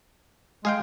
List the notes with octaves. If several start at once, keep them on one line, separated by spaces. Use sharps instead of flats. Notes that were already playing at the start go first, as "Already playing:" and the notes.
G#3 G#4 F5 G5